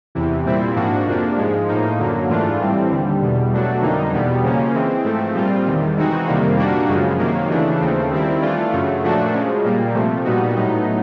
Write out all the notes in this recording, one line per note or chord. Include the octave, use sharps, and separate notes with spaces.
E2 C3 E3
A#2 G3 C4 E4
G#2 F3 A#3 D4 F#4
F2 C3 F3 A#3 D4
G#2 F3 G#3
A2 F3 A#3 D#4
F#2 D3 F#3 A#3
G#2 E3 A3 D4 F4
A2 E3 G3 C4
D#2 D3 G3
E2 B2 G3
B2 F#3 A3 D4 F#4
F2 D3 G3 A#3 D#4
E2 B2 G3 B3
C#3 F3 A#3 C#4
E3 G#3 C4
G#2 F3 A3 C4
A#2 G3 C4 F4
E2 C3 D#3 G3
E3 G#3 C4 D#4 F#4
F2 C3 D#3 G3 A#3
A#2 G3 A#3 D4 F#4
F#2 C#3 F3 G#3
C3 D#3 F#3 A#3
C#3 E3 A3 D4
D#2 C#3 F3 A3 C4
D#3 G3 C4 E4
E3 A3 D4 F4
F#2 C#3 F#3 A3
A#2 F3 A3 D4 F#4
C#3 F3 G#3
A#2 G3 A#3
C3 F3 A3
A#2 G3 B3 D#4 F#4
A2 F#3 B3 D#4